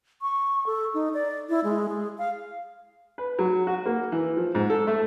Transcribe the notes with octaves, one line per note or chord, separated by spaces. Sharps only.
C#6
A4
D#4
D5
E4
G#3
G#4
F5
B4
F#3
F#4
A#3
E3
F3
G#2
A4
A3